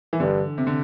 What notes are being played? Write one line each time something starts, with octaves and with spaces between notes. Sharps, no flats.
E3
G2 D3
C3
D3